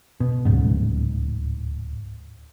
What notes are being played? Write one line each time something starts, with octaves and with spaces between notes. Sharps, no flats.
B2
D1 C#2 G#2